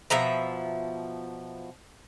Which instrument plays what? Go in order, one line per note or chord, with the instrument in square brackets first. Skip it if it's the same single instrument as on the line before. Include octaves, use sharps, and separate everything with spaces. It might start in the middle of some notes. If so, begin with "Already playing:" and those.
[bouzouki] B2 F3 E5 A#5